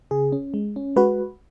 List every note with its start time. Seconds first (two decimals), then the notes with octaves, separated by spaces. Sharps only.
0.11 C#3 G#4
0.32 C#4
0.54 G#3
0.76 C#4
0.96 G#3 F#4 B4